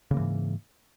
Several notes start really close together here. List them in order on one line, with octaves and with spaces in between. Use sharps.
C#3 A#3 E3 G#2